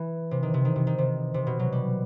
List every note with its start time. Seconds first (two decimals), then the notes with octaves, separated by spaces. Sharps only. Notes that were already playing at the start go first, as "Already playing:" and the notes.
Already playing: E3
0.31 C3
0.43 D#3
0.54 C3
0.65 D#3
0.76 C3
0.87 D#3
0.98 C3
1.34 C3
1.47 B2
1.59 F#3
1.72 G3